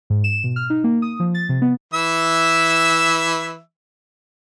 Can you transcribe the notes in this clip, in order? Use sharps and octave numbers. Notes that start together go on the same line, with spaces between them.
G#2
E7
B2
F6
D#4
A#3
D#6
F3
A6
C3
B3
E3 E5 E6